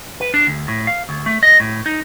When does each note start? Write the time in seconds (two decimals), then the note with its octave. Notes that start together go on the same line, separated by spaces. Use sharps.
0.21 B4
0.34 D4
0.47 D2
0.68 A2
0.87 F5
1.09 D2
1.26 A3
1.43 D#5
1.60 A2
1.86 D#4